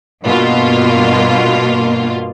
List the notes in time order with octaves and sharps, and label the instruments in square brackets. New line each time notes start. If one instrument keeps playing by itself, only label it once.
[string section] G2 B2 A#3 F4